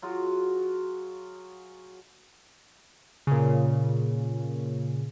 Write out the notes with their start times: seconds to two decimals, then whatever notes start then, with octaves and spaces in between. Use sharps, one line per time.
0.02 F#3 F4 F#4 G#4
3.27 A#2 C#3